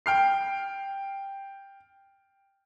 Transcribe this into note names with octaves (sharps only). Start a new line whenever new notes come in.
G5 F6 C7